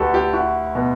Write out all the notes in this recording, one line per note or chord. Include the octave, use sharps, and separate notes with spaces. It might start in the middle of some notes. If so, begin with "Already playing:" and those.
Already playing: D2 E4 F#4 G4 A4 B4 D5
G4
E4 F#4
B2